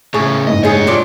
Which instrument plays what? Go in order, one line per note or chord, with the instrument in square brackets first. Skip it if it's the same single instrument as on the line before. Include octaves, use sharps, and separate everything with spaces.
[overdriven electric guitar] A2 C#3 [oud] G#4 [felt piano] C#6
[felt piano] F#1 G#2 [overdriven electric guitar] D#5
[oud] D2 G#4 [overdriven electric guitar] G4 C#5
[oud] A#2 D4 D5 [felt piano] F4